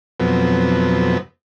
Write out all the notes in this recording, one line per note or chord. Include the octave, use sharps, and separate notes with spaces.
F2 B2 F#3 B3 C4